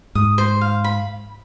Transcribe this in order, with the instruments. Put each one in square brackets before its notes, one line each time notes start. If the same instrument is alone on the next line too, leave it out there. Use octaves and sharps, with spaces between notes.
[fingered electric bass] G#2 [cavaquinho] D#6
[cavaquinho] C5
F5
B5